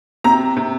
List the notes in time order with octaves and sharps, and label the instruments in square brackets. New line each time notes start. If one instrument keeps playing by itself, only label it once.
[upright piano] C3 [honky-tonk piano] A#5
[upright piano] C3